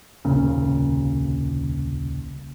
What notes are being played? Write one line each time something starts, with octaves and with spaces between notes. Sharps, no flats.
D#1 C2 A#2 C#3